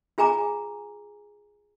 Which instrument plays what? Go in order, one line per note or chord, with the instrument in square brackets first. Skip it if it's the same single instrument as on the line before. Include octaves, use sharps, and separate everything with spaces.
[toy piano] F4 G#4 G#5 A#5 D6